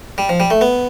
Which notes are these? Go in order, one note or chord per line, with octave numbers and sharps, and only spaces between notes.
G3
F3
G3
A3
B3